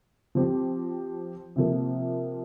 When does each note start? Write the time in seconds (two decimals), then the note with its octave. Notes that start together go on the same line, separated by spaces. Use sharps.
0.35 F3 C4 G4
1.56 C3 F3 A#3